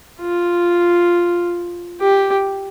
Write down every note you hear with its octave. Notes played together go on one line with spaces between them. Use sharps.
F4
G4